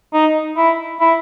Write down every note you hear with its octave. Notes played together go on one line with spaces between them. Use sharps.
D#4
E4
E4